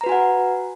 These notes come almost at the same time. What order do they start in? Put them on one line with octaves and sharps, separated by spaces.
A#5 B4 F#4 G#5 F#5